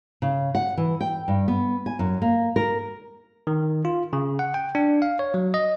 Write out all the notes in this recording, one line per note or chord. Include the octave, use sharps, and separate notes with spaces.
C#3
F#5
E3
G5
G2
B3
G#5
F#2
A#3
A#4
D#3
F4
C#3
F#5
G5
D4
F5
C#5
F#3
D#5